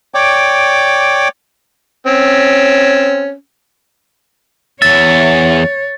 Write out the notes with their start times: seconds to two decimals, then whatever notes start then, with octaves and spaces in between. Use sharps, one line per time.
0.14 C#5 D5 G5 D6
2.07 C4 C#4
4.82 E2 C#5 E5 A6